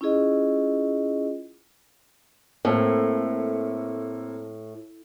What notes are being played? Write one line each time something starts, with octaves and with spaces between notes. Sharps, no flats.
C#4 E4 F4 G#4 D#5
A2 A#3 C4 A4